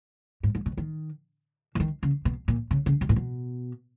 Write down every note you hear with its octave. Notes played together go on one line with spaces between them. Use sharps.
G#2
G#2
B2
D#3
E3
D#3
C#3
B2
A#2
C#3
C#3
B2
A#2
B2